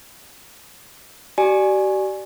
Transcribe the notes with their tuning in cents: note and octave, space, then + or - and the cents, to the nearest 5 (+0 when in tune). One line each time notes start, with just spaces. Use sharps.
G4 -45 D5 +15 G#5 +0